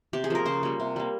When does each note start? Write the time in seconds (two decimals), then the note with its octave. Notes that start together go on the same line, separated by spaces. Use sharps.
0.13 C3 G4
0.24 G#4
0.30 F3 A#3 A#4
0.46 C#3 C5
0.63 G3 A#3
0.80 C3
0.96 G3 A#3